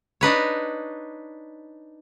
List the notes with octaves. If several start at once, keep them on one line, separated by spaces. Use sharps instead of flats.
D4 D#4 B4 C#5